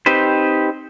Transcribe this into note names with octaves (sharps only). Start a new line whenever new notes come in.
C4 D#4 G4 B4 C5